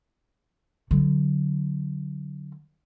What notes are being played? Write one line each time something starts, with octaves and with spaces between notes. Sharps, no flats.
D3 F#3